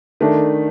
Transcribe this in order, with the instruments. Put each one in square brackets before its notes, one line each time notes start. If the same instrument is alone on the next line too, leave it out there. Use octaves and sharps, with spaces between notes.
[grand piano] D#3 A3 D4